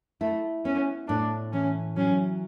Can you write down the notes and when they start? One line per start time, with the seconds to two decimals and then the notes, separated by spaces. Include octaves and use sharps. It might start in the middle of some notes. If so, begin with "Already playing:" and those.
0.21 A3 E4
0.65 B3 C#4
1.08 A2 D4
1.53 E3 C#4
1.96 F#3 C#4